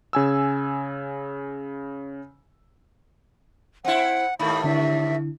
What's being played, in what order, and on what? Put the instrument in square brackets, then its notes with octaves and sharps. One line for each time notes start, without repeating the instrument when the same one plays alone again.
[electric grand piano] C#3 G#5 E6
[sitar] C4 E4 [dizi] F#5
[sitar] D#2 G#2 A3 [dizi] B5
[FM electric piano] D3 D4 E4 [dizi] E5